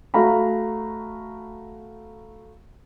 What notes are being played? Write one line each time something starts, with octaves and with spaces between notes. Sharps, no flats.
A3 F#4 F5 A#5 B5